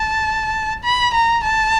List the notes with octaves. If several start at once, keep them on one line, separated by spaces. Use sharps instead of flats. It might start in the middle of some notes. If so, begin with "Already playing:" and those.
Already playing: A5
B5
A#5
A5